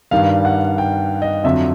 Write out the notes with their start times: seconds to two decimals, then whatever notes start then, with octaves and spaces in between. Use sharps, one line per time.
0.11 G2 D#3 G3 F5
0.45 F#5
0.78 G5
1.22 D#5
1.44 F2 D3 F#3 E5